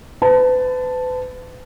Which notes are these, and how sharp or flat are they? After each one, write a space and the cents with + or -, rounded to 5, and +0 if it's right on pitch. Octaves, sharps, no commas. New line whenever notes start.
B4 +40 A5 +0